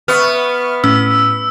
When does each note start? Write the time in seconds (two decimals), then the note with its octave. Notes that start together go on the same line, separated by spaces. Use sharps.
0.08 B3 E5 C#6 F6
0.84 A2 C#4 E6